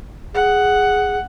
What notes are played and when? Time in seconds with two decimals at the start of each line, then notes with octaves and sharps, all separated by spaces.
0.34 G#4 F#5